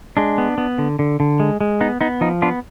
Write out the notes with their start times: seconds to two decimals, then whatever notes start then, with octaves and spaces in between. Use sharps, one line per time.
0.17 G#3 D4
0.38 B3
0.58 B3
0.78 D3
0.99 D3
1.20 D3
1.40 G#3
1.60 G#3
1.81 B3 D#4
2.01 B3 D#4
2.21 F3 D#4
2.42 B3 D4 F4